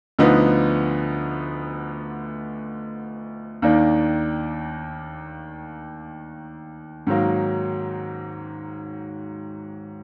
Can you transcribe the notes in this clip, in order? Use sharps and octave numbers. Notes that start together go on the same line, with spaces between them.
D2 D3 F3 B3 D#4
D#2 D#3 A#3 D4
G#2 D#3 F#3 A#3